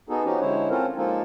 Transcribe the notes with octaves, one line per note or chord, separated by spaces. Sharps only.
B3 D#4 F#4 G#4 A4
F3 C#4 D#4 F#4 G4
D3 G#3 E4 C5 C#5
C4 C#4 F4 A4 A#4 C5
F3 G#3 A#3 D#4 F4 A4